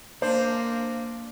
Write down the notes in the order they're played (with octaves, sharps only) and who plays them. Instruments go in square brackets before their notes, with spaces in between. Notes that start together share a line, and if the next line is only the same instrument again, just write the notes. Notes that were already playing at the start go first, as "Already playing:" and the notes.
[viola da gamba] A#3 [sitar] D4 [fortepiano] C5